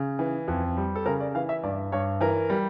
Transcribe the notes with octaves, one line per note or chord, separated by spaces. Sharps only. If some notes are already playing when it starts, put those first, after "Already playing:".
Already playing: C#3
E3
F2
G3
A4
C#3 A#4
D5
E3 F5
E5
G2 D5
G2 C#5
E3 A#4
G3